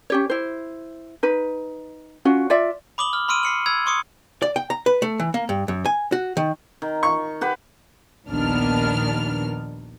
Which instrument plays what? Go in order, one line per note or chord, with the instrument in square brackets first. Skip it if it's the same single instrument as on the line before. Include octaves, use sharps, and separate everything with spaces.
[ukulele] C#4 G4 C#5
E4 C5
D#4 B4
C#4 F4 F#4
F4 D5 E5
[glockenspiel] B5 D6 D#6 F#7 G7
F6
B5 C6 E6 F6 D7 D#7
C7 C#7 F#7
B5 E6 G#6
C6 C#6 D#6 C#7
[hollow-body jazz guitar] D5
G5
A#5
B4
A3
E3
A#3
G2
F#2
G#5
F#4
D#3
[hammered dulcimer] D#3
[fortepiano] C#6
[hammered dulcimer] G4 B4 F#5
[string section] A#1 D#2 D#3 B3 D4 F6